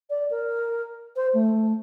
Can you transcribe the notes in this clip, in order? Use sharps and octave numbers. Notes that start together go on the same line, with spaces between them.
D5
A#4
C5
A3